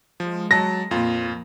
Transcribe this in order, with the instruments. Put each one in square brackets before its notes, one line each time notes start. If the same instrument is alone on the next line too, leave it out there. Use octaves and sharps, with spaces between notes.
[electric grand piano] F3 [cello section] G#3
[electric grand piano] F#3 A5 [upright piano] A#6
[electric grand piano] F2 F4 [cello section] A#2 F3